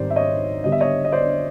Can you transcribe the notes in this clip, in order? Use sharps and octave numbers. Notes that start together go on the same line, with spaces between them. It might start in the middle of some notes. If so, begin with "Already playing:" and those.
Already playing: G#2 D#3 G3 C4 D#4 C5 D5
E5
C#5 D#5
D3 G3 B3 D4 D#5
E5
C#5 D#5
D#5
C5 D5